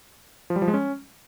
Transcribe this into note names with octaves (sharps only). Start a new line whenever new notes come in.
F3
G3
F3
G#3
C#4